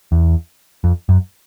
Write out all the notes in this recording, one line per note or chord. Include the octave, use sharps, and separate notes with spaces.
E2
F2
F#2